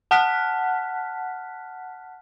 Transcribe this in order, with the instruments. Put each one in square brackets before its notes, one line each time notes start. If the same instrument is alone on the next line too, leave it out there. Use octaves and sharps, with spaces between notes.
[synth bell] F#5 A5 F6 F#6 B6